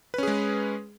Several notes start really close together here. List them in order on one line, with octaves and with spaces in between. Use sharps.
B4 C#4 G#4 G#3